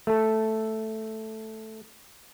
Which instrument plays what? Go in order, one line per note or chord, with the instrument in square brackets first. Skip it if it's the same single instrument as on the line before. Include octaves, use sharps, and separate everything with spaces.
[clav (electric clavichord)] A3 A4